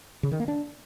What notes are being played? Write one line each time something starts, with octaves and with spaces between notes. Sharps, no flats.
C#3
D#3
A#3
D4